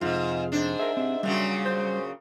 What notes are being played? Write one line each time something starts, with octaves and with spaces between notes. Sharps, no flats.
F2 G#2 C3 F4
G#2 D4
G#4 A#4 E5
C4 G4
A#2 C#3 F#3 G3
C5